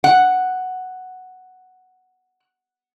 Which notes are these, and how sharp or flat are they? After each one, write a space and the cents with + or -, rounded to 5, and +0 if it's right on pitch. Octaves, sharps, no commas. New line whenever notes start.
F#5 +0